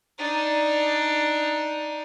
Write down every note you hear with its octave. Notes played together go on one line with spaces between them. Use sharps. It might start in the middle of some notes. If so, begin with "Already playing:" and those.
D4 D#4